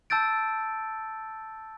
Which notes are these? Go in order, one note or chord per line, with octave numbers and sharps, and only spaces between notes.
A5 E6 G6 A6 D7